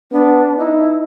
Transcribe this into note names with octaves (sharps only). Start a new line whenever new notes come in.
B3 D4
D#4 E4